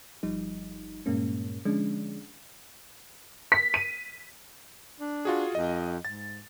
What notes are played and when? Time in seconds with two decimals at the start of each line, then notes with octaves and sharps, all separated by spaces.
0.23 G1 F3 G3 D#4
1.06 G2 A#2 G#3 A#3 C#4
1.65 D3 F3 G#3 C#4 D4
3.52 B6
3.74 D#7
5.00 D4
5.25 F4 F#4 G#4
5.55 F2 D#5
6.05 G#2 A6